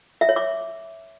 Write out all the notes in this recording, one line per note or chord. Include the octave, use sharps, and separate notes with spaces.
E5
C#5
D6